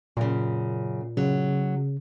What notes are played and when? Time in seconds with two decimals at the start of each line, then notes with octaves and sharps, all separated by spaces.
0.17 F#2 A#2 C#3
1.17 C#3 F#3